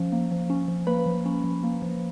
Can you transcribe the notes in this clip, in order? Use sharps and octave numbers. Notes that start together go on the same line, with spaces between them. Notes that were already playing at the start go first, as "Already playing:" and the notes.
Already playing: F3 C#4
A#3
F3
C#4
F3
A#3 B4 B5
F3
C#4
F3
A#3
F3